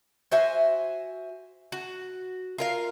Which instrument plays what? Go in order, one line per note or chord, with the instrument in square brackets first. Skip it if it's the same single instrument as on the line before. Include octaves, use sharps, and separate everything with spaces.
[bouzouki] F#4 C5 E5 G#5
F#4
F4 A#4 F5